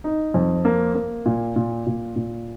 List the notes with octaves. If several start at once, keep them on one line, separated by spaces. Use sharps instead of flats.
D#4
F2
A#3
A#3
A#2
A#2
A#2
A#2